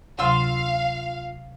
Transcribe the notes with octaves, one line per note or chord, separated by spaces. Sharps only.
D2 C3 F#3 F4 F5 C6 E6